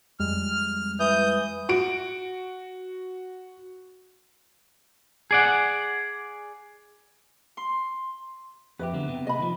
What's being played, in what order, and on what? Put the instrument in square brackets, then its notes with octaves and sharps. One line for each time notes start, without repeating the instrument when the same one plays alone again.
[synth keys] F2 G3 G#3 [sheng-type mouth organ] F6
[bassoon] E3 [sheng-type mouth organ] D#6 G6
[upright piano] F#4 D7
[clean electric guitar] G#4 D5 F#5
[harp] C6
[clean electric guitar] F2 G4 [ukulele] B4 E5
[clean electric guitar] D3 F#3 B3
C3 B3
[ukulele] D#5 B5
[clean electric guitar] D#3 F3